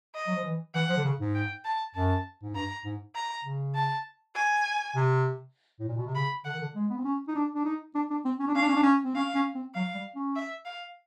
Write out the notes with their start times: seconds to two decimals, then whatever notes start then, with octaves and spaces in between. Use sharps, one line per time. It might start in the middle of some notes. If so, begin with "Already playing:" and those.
0.15 D#5
0.27 F#3
0.36 F3
0.45 E3
0.74 E3 F#5
0.89 F3
0.97 D3
1.05 C#3
1.20 G#2
1.35 G5
1.65 A5
1.95 F#2 A5
2.43 G#2
2.55 G2 A#5
2.85 G#2
3.15 A#5
3.44 C#3
3.75 A5
4.35 G#5
4.96 C3
5.80 A2
5.88 A#2
5.97 B2
6.06 C3
6.15 C#3 B5
6.45 D3 F#5
6.53 D#3
6.61 D3
6.75 G#3
6.90 B3
6.98 C4
7.04 C#4
7.28 D#4
7.35 D4
7.55 D4
7.65 D#4
7.95 D4
8.10 D4
8.25 C4
8.40 C#4
8.48 D4
8.54 C#4 F5
8.61 D4
8.69 C#4
8.76 D4
8.83 C#4
9.04 C4
9.15 C#4 F5
9.35 C#4
9.55 C4
9.75 F#3 F5
9.95 G3
10.16 C#4
10.36 E5
10.65 F5